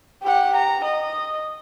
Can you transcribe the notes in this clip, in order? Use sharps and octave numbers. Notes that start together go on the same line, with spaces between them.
G4 F#5
A#5
D#5